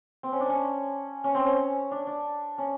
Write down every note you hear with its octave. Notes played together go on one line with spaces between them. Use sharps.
C4
C#4
D4
C#4
C#4
C4
C#4
D4
D4
C#4